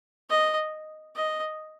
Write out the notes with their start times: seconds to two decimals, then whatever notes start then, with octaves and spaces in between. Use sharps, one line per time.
0.29 D#5
1.15 D#5